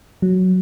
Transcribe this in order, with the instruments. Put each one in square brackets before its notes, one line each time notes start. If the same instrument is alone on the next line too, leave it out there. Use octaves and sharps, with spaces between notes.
[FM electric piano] F#3